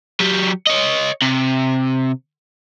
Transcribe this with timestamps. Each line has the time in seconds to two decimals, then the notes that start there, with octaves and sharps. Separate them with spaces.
0.20 F#3 G4
0.67 C#5 D#5
1.22 C3